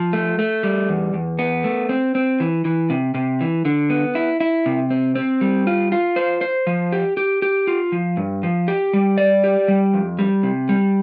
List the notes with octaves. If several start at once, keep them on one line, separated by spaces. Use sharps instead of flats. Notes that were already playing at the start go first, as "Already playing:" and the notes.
Already playing: F3
A3
A3
G3
E2
E2
B3
A3
C4
C4
E3
E3
C3
C3
E3
D3
B3
E4
E4
C3
C4
C4
G3
F4
F4
C5
C5
F3
G4
G4
G4
F4
F3
G2
F3
G4
G3
D5
G4
G3
F2
G3
C3
G3